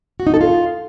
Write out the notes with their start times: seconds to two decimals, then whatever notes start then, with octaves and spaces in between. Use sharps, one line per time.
0.20 F#4
0.27 D#4
0.34 A4
0.41 F4